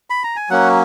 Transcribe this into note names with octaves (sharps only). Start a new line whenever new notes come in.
B5
A#5
G#5
F#3 A#3 C#4 F#5